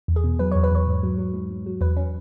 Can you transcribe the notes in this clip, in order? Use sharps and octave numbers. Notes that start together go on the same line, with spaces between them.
E2
G#4
B2
F#3 B4
C#5
E2
B4
E2 C#5
G#2
F#3
F#3
G#2
G#2
F#3
E2 B4
C#4